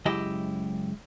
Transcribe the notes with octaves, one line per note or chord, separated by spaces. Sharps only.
C#2 F#2 E4 G4 D#5